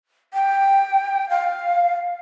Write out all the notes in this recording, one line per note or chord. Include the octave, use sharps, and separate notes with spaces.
G5
F5